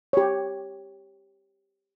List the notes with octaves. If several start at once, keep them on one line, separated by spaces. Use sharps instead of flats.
G4 C#5